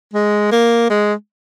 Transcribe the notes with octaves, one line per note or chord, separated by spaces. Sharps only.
G#3
A#3
G#3